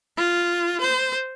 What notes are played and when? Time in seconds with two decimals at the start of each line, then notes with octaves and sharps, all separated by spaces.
0.17 F4
0.80 C5